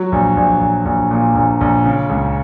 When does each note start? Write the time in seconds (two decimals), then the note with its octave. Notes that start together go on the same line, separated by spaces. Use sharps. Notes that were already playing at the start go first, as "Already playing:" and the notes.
Already playing: F#3
0.12 A#1
0.37 A#1
0.61 A#1
0.85 A#1
1.11 A#2
1.35 A#1
1.61 A#1
1.85 C#3
2.09 C#2